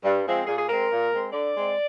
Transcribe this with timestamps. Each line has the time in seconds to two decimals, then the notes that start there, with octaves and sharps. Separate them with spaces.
0.04 G2
0.25 F3 G#3 C4
0.47 A#2 G#4
0.58 G#4
0.68 G#3 C4 A#4
0.91 A#2
1.12 G#3 C4
1.33 D3 D5
1.55 G#3 C4